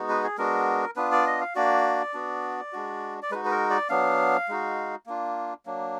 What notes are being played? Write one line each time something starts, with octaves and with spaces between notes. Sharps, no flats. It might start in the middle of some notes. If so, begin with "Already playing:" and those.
Already playing: G#3 B3 D#4 F#4
B4
G#4
G#3 B3 D4 F#4 A#4
B3 D4 F4 B4
D5
D#5
F5
A#3 D4 F#4 D5
B3 D4 F#4
G#3 D4 F#4
D5
G#3 D#4 F#4 B4
B4
A#4
D5
F#3 B3 D4 F5
G#3 D#4 F#4
A#3 D4 F4
F#3 A#3 D4